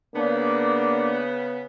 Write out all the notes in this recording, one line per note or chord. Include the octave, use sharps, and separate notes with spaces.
C#3 A#3 B3 D4